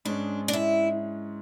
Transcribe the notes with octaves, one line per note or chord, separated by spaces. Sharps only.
G#2 G#3 C#4 D4
D4
E4